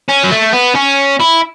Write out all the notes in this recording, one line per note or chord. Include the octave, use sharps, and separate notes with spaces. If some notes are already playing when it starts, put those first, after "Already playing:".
C#4
F#3
A3
B3
C#4
E4